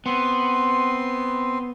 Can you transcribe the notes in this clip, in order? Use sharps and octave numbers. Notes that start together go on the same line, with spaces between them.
B3 C4 C6